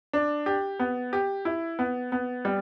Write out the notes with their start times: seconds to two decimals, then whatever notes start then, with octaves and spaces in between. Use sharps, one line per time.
0.13 D4
0.46 G4
0.79 B3
1.13 G4
1.45 E4
1.79 B3
2.12 B3
2.45 G3